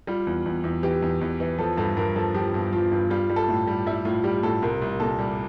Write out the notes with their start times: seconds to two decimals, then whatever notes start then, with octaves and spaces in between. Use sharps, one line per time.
0.07 G3 F4
0.27 E2
0.46 E2
0.64 E2
0.83 E3 G4
1.02 E2
1.21 E2
1.40 E3
1.58 F3 A4
1.77 G2 A4
1.97 G2 A#4
2.16 F3 A4
2.35 F3 G4
2.54 G2
2.73 F3 F4
2.92 G2
3.10 G3 F4
3.29 G3
3.36 A4
3.49 A2
3.67 G3
3.86 G3 E4
4.05 A2 F4
4.24 G3 G4
4.43 A2 A4
4.62 C2 A#4
4.82 C2
5.00 A#2 A4
5.19 G3